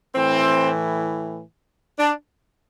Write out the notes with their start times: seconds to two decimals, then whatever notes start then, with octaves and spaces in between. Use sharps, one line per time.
0.15 A2 E3 C4
1.98 D4